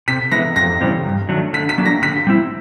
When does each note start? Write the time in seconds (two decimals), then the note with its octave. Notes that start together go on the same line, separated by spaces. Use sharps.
0.08 C3 B6
0.32 E3 G#3 B3 E4 A#6
0.56 F2 A#6
0.81 C#3 E3 G3 C4
1.05 G2
1.29 D#3 F#3 A3 D4
1.53 D3 B6
1.69 B6
1.78 F#3 A#3 D4
1.85 A#6
2.02 D3 B6
2.27 G3 C4 E4